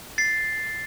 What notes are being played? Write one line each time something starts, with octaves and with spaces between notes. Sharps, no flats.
A6 C7